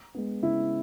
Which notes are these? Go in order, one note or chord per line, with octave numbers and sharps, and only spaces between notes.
G#3 B3
C#3 E4